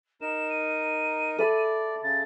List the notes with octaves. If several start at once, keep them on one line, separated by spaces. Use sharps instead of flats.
D#4 A#4 E7
D#7
A4 D5 E5 B5
C#3 A6